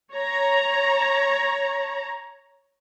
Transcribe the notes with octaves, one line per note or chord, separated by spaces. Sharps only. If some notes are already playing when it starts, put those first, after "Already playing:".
C#5 A#5